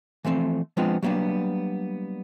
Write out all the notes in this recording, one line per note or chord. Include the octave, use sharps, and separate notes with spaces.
E3 F3 A3 C4
F3 G#3 B3 C4 D4 F4
F#3 G3 A#3 B3 D4